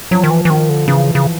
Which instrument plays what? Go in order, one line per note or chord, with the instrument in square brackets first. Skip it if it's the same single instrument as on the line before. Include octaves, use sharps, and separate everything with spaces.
[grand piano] F3 [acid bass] F#3
[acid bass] D#3
E3
E3
[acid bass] D#3 [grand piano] F3
[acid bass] D3
[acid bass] C#3 [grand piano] E3
[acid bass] C#3